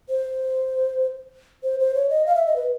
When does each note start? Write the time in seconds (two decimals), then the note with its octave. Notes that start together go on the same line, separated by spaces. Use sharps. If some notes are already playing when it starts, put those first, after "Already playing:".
0.09 C5
1.63 C5
1.79 C5
1.95 C#5
2.10 D#5
2.26 F5
2.35 E5
2.46 D#5
2.56 B4